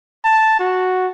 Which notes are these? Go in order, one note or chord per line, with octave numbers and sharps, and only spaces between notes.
A5
F#4